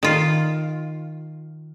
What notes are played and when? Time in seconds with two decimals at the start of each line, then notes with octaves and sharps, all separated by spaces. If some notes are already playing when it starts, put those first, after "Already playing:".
0.03 D#3 F4